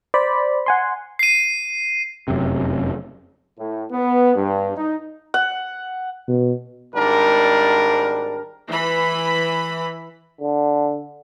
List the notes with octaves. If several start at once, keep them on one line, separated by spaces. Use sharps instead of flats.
C5 D5 B5
F#5 G#5 C6
C7 D#7
F1 F#2 C3
A2
B3
G2
D#4
F#5
B2
G#1 G#2 G3 D4 A#4
E3 B5
D3